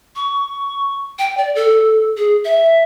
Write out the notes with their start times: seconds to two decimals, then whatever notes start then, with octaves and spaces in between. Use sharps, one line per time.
0.16 C#6
1.19 G5
1.37 D5
1.55 A4
2.17 G#4
2.45 E5